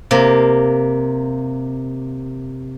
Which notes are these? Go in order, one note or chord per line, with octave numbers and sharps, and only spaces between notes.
C3 A#3